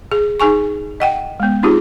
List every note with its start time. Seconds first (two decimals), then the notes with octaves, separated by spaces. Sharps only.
0.12 G#4
0.40 D#4 G#4 G#5 C#6
1.00 D#5 F#5 G5
1.40 G#3 B3
1.63 C4 D#4 F4 G4 G#4